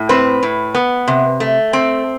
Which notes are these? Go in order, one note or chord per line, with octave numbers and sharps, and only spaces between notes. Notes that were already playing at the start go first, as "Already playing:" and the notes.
Already playing: A2
C4 B4
A2
B3
C3
A3
C4